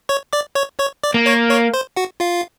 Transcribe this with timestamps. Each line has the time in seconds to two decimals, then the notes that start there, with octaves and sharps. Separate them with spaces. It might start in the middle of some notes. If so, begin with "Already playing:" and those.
0.09 C#5 C#6
0.33 D5 D6
0.55 C#5 C#6
0.79 C#5 C#6
1.03 D5 D6
1.14 A#3
1.26 C#5 C#6
1.50 C#5 C#6
1.74 C5 C6
1.96 F#4 F#5
2.20 F4 F5